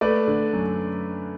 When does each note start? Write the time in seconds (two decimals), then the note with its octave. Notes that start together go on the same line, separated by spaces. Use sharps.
0.01 A3 B4 D5
0.27 D3
0.53 F#2